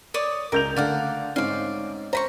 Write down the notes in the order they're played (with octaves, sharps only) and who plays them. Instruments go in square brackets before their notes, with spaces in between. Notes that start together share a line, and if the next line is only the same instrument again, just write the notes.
[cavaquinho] C#5 D5 D#6
[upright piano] C#2 G6 F7 [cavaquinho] A#4
[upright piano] D3 A3 [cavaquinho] D5 F5 F#5
[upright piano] G#2 C4 C#4 [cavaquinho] D5 F5
[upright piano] C5 [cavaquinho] A#5 B5 C#6